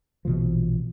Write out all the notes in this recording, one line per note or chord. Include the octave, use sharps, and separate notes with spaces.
A#1 B2 E3 F3